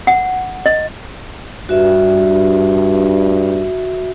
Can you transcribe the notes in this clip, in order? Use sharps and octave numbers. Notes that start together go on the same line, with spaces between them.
F#5
D#5
G2 F#4 E5